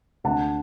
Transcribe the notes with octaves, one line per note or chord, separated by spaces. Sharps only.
D2 D3 F#5 A5